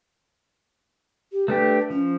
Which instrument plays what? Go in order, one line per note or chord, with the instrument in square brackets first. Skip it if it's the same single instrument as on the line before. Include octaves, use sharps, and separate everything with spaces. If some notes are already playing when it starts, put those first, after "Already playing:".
[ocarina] G4
[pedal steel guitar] A3 D4 G4 [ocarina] B4
[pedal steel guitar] F3 [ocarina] C#4